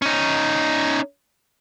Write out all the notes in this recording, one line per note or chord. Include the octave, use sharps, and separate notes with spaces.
C#4 D#4